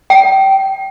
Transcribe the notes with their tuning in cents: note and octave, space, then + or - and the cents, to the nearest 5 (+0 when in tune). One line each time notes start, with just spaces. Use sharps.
G5 -20